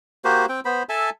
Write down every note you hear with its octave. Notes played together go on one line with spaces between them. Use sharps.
A#3 F#4 G4 C5
C4 G5
B3 C5 B5
A4 E5 G#5 A5